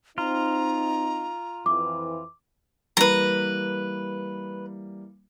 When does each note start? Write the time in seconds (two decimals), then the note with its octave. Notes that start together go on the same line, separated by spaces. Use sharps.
0.18 C4 D#4 F4 A#5
1.66 F2 E3 D6
2.97 E3 G3 A#3 B4 A#5